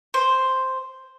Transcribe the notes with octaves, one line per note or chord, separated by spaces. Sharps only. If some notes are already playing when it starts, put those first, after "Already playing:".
C5